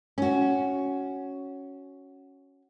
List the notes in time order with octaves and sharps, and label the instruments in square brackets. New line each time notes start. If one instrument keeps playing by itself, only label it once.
[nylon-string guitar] C#4 F#4